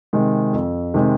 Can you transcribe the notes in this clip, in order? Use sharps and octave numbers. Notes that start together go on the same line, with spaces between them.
C3 D#3 G#3
F2
C3 D#3 G#3